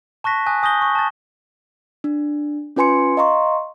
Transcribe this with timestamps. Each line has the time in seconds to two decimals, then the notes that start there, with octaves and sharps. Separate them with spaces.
0.24 A5 C#6 F#6 A#6 B6
0.46 G#5 D#6 F#6
0.63 G#5 D#6 G6 A#6 G7
0.81 C#6
0.95 A5 A6
2.04 D4
2.76 C#4 F4 B4 G#5 C6 C#7
3.17 D#5 F5 A#5 C6 C#6